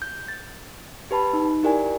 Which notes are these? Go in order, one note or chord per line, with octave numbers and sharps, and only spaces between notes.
G6
A6
G4 B4 A5 B5
D#4
E4 G4 A#4 D5 G#5